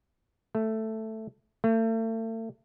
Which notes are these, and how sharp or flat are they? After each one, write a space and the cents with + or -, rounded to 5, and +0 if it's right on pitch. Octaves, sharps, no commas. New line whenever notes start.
A3 +5
A3 +40